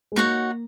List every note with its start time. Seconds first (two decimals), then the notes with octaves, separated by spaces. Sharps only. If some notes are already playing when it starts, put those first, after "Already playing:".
0.12 G#3
0.16 A#3 D#4 F#4 C#5 F#5